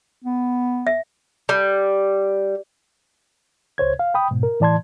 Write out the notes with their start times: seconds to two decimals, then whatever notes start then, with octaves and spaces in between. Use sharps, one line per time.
0.25 B3
0.87 E5
1.49 G3
3.78 C#2 C5 C#5 G#6
3.99 F5
4.14 G5 B5 D#6
4.31 G#2 B2
4.43 A#4
4.60 A2 E3 D5 A5 C6 G#6